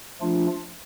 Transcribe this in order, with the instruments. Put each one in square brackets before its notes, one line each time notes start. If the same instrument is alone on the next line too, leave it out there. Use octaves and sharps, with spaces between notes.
[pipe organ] F3 A3 D4 F4